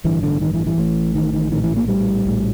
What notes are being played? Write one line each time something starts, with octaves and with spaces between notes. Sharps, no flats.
A1 G2 D3 E3
D3
D#3
E3
E3
A1 A2
D#3
D#3
A#1 A2 D#3
E3
A#3
G3
A#1 A2